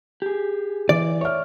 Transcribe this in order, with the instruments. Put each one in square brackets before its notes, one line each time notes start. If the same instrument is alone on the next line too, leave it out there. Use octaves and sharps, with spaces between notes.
[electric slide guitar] G4 G#4
[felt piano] E3 [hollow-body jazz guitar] D5
[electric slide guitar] C#5 [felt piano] E5 F6